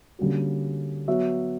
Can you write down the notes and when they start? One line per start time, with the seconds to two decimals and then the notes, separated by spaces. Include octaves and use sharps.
0.19 D3 G3 A#3 C#4 F#4
1.08 F#3 B3 F#4 C#5 E5